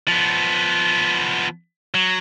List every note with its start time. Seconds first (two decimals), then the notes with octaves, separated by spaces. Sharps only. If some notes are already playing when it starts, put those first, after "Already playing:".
0.08 F3 B3
1.94 F#3